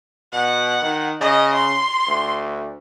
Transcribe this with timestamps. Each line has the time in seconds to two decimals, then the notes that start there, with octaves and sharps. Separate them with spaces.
0.32 B2 F#5
0.82 D#3
1.21 C#3 D#5
1.55 C6
2.08 D2